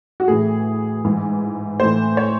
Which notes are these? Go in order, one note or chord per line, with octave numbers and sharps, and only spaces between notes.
F#4
A2 E3 G#4
G#2 E3
A2 E3 C5
C#5